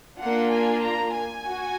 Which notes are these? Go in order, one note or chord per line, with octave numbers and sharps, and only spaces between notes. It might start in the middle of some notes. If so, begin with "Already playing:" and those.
A#3 D4 F4 F#5
G#5
A#5
G#5
F#4